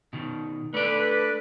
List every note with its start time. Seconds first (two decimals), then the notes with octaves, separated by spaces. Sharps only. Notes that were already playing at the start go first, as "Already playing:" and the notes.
0.13 B2 D#3
0.74 A3 D4 A4 B4 D5